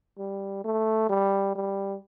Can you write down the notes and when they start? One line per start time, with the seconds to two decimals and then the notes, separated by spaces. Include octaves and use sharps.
0.18 G3
0.64 A3
1.09 G3
1.55 G3